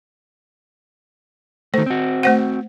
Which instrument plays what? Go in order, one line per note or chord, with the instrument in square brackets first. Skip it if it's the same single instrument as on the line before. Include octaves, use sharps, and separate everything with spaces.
[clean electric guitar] D#3 A3 [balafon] C5
[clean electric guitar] C4 F#4
[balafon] A3 C5 F#5